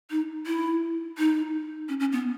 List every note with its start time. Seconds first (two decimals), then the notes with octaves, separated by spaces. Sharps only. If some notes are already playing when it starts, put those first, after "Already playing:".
0.10 D#4
0.46 E4
1.18 D#4
1.89 C#4
2.00 C#4
2.12 B3